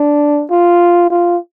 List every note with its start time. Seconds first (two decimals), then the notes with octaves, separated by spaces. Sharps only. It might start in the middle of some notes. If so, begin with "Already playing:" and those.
Already playing: D4
0.51 F4
1.10 F4